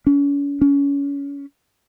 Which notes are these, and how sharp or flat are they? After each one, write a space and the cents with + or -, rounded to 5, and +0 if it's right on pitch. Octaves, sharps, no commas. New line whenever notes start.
C#4 +40
C#4 +25